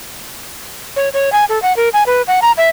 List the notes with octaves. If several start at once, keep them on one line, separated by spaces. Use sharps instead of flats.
C#5
C#5
G#5
A4
F#5
A#4
G#5
B4
F#5
A#5
E5